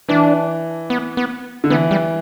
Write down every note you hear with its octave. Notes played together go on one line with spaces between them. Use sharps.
E3 D4
B3
B3
D3
E3 B3
G3